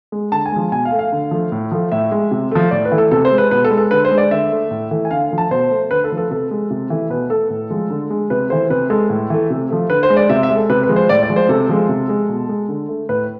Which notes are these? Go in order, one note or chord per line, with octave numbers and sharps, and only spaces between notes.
G#3
D3 A5
G#5
F3 G#3
B2 G#5
F5
A3
F5
D3
F3 A3
A2
F3 A3
A2 E5
G#3
C3
F3 A3
A2 D5
B4
E3 A3
A4
C3 A4
C5
G#3
B4
B2 B4
A4
G#3
A4
D3 B4
C5
G#3
D5
D3 E5
A3
A2
E3 A3
G#5
D3 F5
F3 A3
A5
B2 C5
A3
D3 B4
A4
F3 A3
A4
C3 A4
G#3
C3
E3 A3
B2 B4
A3 A4
A2
F3 G#3
D3
G#3
C3 B4
E3 A3 C5
C3 B4
G#3 A4
A2
E3 A3
C3
F3 A3
D3 B4
C5
G#3
D5
C3 E5
E5
G#3
A4
C3 B4
B4
F3 G#3
C5
A2 D5
D5
F3 G#3
C5
C3 A4
F3 G#3
C3
G#3
B2
G#3
D3
A3
A2 B4